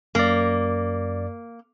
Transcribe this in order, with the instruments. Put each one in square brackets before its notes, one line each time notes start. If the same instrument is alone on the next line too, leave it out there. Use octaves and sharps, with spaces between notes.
[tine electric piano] F#2 D5 [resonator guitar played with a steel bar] A#3